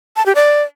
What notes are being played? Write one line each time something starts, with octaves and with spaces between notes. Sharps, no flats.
A5
G4
D5